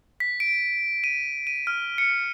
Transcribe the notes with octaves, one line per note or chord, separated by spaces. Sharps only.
B6
D7
D#7
D#7
F6
C#7